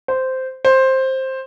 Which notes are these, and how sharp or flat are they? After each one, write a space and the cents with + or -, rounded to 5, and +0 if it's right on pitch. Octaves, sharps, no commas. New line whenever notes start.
C5 -10
C5 +10